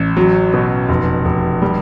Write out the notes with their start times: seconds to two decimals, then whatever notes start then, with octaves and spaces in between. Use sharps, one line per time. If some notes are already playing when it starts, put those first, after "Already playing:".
Already playing: A1
0.17 F#3
0.54 B2
0.89 F1
1.25 F1
1.62 G3